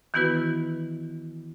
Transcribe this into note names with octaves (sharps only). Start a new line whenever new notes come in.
D#3 E3 B3 E4 F#4 B4